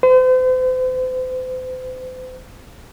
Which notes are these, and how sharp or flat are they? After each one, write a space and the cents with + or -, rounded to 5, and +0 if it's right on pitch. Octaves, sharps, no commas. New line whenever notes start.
C5 -40